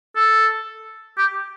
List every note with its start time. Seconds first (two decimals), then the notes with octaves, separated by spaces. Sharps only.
0.16 A4
1.18 G4